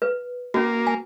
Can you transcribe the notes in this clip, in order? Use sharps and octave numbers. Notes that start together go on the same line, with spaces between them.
B4
A#3 C#4 F#4
G#5